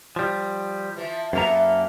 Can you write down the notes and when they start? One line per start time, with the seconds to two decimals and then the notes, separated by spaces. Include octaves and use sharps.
0.16 F3 G3
0.97 E3 F3
1.33 F#2 A#3 B3 A4 E5 A#5